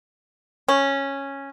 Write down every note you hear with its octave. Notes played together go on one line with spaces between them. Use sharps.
C#4